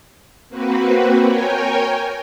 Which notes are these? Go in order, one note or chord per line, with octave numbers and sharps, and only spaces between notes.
A#3 C4 F#4 B4
A#4 C#5 G5 G#5